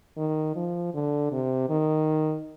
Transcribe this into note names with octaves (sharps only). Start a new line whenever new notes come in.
D#3
F3
D3
C3
D#3